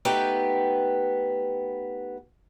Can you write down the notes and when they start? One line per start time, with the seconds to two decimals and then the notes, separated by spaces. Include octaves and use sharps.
0.05 A3 B3 D#4 G4 B4 G5